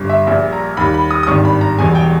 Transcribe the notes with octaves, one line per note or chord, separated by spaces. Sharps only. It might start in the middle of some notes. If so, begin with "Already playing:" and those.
Already playing: G1 G2 G3
E5
A#1 A#2 G3 E5
A#5
D#2 D#3 G3 B5
B5
D#6
D#6
G#1 G2 D#3 G3 C#6
B5
A#5
E1 E2 B2 G3 G#5
G5